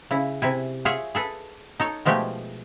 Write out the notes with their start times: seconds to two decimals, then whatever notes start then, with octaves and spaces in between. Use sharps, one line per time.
0.11 C#3 E4
0.42 C3 E4 G#5
0.85 F4 G#4 C#5 E5 F#5
1.15 G#4 A4 B4
1.80 D#4 A4 C#5
2.05 B2 F3 G#3 A3 G4